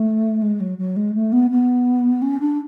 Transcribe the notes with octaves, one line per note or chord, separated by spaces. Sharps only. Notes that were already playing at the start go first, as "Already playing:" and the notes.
Already playing: A3
G#3
F#3
F#3
G#3
A3
B3
B3
C#4
D4